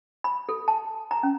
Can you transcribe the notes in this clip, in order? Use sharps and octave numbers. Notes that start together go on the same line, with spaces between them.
B5
A4
A5
A#5
C#4